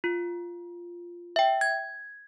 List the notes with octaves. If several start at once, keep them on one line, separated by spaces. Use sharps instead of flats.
F4
E5 G5
G#6